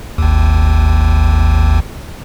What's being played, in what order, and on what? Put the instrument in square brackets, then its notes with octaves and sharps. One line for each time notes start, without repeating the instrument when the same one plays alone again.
[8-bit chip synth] G#1 D#2